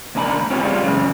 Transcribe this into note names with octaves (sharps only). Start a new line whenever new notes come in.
C#2 A#3 D4 G#5 B5
C4 F4 G4 B4 C#5
G3 G#3 F4
F#2 C#3 E3